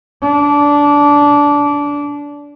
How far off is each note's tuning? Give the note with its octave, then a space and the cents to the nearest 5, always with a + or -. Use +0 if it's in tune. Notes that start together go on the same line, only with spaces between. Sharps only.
D4 -15